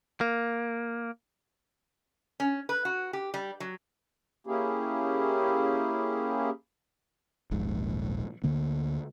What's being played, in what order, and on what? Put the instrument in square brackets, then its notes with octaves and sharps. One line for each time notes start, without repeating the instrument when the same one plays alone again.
[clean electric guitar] A#3
[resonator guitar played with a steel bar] C#4
B4
F#4
G4
G3
F#3
[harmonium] A#3 C#4 E4 G4 G#4
[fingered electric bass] D#1 A#1 G#2
D2 D3 A#3